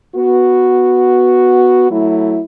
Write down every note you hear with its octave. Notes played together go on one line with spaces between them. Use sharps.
B3 F#4
F#3 A3 E4